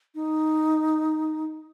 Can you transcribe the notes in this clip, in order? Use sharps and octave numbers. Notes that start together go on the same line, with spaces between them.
D#4